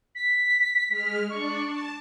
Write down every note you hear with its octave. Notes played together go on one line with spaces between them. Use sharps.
B6
G#3 F6
D4 D5 C#6
A5